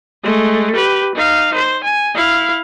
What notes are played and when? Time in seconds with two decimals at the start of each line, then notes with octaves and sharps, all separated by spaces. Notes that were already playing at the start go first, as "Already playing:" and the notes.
0.23 G#3 A3
0.75 G4 B4
1.15 D#4 F5
1.54 C5
1.84 G#5
2.14 E4 F5